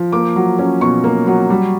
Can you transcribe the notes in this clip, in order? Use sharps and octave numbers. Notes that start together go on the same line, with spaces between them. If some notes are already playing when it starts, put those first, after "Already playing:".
Already playing: F3
A#3 D6
F#3
C#4
B2 C#6
A#3
F#3
G3